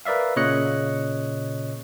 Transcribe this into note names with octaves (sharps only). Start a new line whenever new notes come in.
A#4 B4 D5 E5 F5
A#2 C#3 C#5 D#5 F#6 C#7